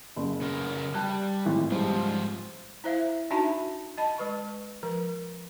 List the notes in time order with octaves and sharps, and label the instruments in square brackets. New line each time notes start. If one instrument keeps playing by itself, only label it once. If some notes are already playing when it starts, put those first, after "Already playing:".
[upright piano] F#1
[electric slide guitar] C#3 B3 A#4
[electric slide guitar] G3 [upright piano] G5 A5 F#6
[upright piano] G#1 A2 E3
[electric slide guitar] G#2 F3 F4 [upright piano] G3 G#3 C4
[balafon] E4 C5 E5 F5
D4 D#4 F#4 E5 A5 B5
D#5 A5 B5
G#3 B4 C#6
F3 A#4